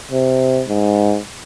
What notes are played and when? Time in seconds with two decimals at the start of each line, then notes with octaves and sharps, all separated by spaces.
0.12 C3
0.68 G#2